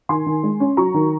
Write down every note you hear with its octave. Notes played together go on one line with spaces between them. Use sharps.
D#3 G#5 C6
D#3
G#3
C#4
F#3 A#5 C#6
D#3